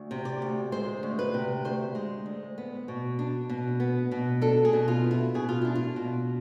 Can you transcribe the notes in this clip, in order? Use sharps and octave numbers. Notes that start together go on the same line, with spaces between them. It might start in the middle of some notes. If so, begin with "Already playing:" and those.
Already playing: D2
C3
D5
D2
G#3 C5
D2
B4
C3
D2 C5
G#3
D2
B3
B2
D4
B2
B3
B2
D4 A4
G#4
B2
F4
B3
E4
B2 G#4
F4
D4 E4
F4
B2